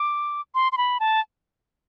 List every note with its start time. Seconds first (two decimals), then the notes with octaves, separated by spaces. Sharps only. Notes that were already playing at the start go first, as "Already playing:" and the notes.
Already playing: D6
0.55 C6
0.72 C6
0.78 B5
1.00 A5